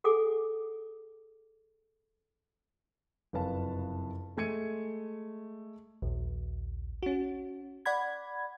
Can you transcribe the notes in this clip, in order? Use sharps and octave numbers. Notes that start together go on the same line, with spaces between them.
G#4 A4 F#5 G#5 D6 D#6
F#1 F2 C3 B4 F5 A5
G#3 A3 G#6 C#7 D#7
A#1 D#2
C#4 F#4
D5 F#5 B5 G#6